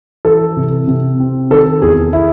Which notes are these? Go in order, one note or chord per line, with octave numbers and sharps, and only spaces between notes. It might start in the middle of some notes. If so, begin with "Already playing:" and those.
E3 A4
C3
C3
C4
D#3 A4
E2 G#4
E4